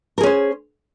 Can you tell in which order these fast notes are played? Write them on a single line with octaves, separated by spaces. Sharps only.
A#4 G#4 C#4 C5